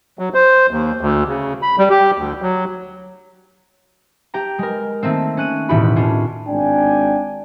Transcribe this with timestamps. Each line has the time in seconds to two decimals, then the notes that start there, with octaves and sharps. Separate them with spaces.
0.19 F#3
0.34 C5
0.70 D#2
1.01 D2
1.27 C#3
1.62 B5
1.78 G3
1.90 G4
2.18 D2
2.42 F#3
4.34 G4 G5 A#5
4.59 G#3 A#4
5.03 D#3 A3 A#3 C4
5.37 C#4 F#6 D#7
5.69 E1 A2 D#3 F#4 G4 B5
5.96 C#4 D4 F4
6.48 G#1 D4 G5 G#5